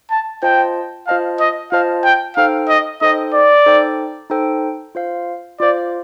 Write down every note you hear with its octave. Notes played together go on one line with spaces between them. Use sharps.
A5
F4 C5 D#5 G5 A5
F4 C5 D#5 F5 A5
D#5
F4 C5 D#5 F5 A5
G5
D#4 A4 C5 F5 G5
D#5
D#4 A4 C5 D#5 G5
D5
D#4 A4 C5 G5
D#4 A4 C5 G5
F4 C5 F5
F4 C5 D5 F5